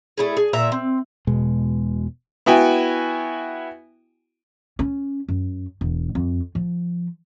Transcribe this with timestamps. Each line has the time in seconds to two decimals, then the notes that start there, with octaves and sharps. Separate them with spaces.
0.17 A3 E4 G#4
0.37 G#4
0.53 A#2 E5 A#5
0.72 C4
1.27 E1 B2 G#3
2.46 B3 E4 F#4 G5 G#5
4.79 C#4
5.28 F#2
5.81 E1
6.15 F2
6.55 F3